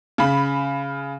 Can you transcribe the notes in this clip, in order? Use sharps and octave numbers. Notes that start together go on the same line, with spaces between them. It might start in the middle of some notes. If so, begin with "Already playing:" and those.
C#3 B5